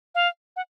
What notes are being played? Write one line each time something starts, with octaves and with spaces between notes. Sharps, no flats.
F5
F#5